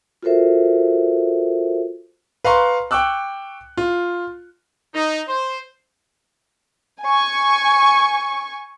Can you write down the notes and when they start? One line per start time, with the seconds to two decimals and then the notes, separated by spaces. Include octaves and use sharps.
0.23 F4 F#4 A4 A#4 C5 E5
2.44 B4 F5 A#5 C6 C#6
2.91 G5 C#6 D6 E6 F#6
3.77 F4
4.94 D#4
5.28 C5
7.03 G#5 C#6